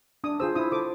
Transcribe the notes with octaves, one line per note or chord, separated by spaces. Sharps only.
D4 D#6
F4 G#4 C5 E6
E4 D#6
A4 C5 D6